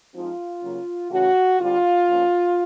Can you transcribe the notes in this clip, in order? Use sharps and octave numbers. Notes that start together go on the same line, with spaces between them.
F3 G#3 C4 D#4 F4
C#3 F#3 A#3 C#4
C#3 E3 A3 C#4 F#4
D3 G3 C4 F4
F3 A#3 C#4